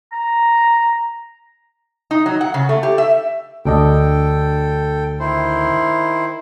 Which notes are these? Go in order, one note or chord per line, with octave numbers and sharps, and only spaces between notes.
A#5
D#4
F#3
F#5
C#3
A3
G4
E5
D2 D4 A4 D#5 G5
D#3 E4 C5